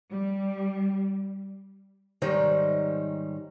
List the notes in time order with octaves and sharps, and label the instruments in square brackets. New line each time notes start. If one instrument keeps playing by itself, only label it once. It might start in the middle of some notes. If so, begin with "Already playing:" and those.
[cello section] G3
[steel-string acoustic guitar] G#2 D#3 G3 D#4 C5 C#5